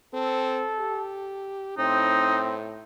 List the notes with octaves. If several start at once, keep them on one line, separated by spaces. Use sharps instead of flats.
C4 A4
G4
A2 C4 D#4